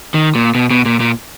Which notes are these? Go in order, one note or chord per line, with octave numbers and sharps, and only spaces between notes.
D#3
A#2
B2
B2
A#2
A#2